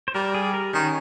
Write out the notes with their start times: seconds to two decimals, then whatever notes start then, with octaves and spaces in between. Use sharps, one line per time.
0.08 C5
0.15 G3 A#4
0.34 G#4
0.53 A#4
0.74 D#3 C#4